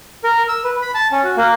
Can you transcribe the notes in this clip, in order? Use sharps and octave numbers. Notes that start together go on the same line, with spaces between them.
A#4
E6
B4
B5
A5
C#4
F#4
A#3